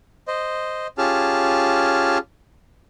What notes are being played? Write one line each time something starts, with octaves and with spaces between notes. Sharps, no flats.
C5 D#5
C#4 F4 G4 G#4 A5 F6